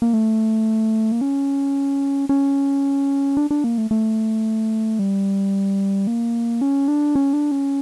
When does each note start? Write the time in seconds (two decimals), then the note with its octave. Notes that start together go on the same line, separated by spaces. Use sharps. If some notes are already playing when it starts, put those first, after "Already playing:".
0.02 A#3
0.13 A3
1.12 A#3
1.21 C#4
2.29 C#4
3.37 D4
3.51 D4
3.64 A#3
3.78 A3
3.91 A3
4.99 G3
6.07 A#3
6.61 C#4
6.88 D4
7.15 C#4
7.33 D4
7.51 C#4